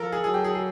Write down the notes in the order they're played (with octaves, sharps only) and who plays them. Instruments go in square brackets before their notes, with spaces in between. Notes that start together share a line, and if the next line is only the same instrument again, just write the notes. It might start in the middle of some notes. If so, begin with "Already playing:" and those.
Already playing: [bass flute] F3 [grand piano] A4 A#4
[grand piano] G#4
[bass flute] F#3 [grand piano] G#4
[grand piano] G4
G#4
G#4